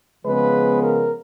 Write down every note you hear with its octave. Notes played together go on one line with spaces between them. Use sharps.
C#3 F3 G#3 B3 B4
A#4